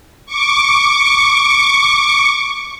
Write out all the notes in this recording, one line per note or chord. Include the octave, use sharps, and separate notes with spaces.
C#6 D6